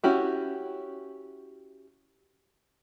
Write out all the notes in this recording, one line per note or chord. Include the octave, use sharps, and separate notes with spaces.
C#4 E4 F#4 G4